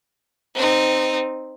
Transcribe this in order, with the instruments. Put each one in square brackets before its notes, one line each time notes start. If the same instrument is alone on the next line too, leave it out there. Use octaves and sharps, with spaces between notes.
[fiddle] C4 D#4